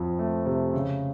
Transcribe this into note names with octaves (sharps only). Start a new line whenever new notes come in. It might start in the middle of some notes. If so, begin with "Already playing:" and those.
Already playing: F2 F3
A3
C3
C#3